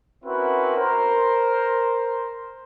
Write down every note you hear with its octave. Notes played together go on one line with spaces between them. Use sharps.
C4 C#4 E4 F#4 A#4 B4
A#4 C5